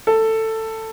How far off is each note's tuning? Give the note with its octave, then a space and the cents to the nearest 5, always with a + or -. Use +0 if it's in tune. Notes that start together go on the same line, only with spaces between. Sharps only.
A4 +15